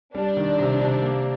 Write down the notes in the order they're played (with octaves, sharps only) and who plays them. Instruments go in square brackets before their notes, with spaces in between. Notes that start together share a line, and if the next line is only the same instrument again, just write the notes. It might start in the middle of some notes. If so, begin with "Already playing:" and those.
[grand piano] G3 [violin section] D4
[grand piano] D#3
C3
C3
A#3